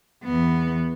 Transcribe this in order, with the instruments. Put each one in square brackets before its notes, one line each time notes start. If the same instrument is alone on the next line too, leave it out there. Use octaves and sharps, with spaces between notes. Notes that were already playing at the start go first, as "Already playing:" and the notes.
[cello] E2 B3